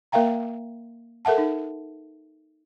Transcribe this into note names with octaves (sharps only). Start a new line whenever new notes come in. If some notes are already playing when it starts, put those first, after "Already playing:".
A#3 A#4 E5 F5 G5 A#5
A4 A#4 E5 F#5 A5
D#4